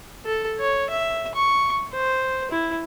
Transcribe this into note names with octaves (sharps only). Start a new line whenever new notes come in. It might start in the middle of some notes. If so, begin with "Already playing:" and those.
A4
C#5
E5
C#6
C5
E4